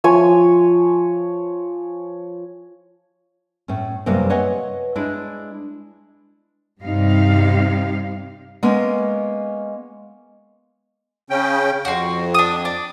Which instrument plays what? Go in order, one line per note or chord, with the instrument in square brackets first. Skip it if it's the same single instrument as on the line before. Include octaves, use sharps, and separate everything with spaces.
[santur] F3 C#5 G#5
[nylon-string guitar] A2 C#4
F#2 C3 G3 A#3 B3 F5
B4 C#5 D#5 F#5 G#5
G#3 D4 E4
[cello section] G2 C3 G3 D#4 F5
[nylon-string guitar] G#3 A#3 B3 C#4
[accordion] C#3 C#4 G5
[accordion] F2 [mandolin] F#4 C6
[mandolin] D4 D#6
D4